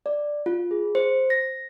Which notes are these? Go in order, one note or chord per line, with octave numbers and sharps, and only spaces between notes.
D5
F4
G#4
C5
A#6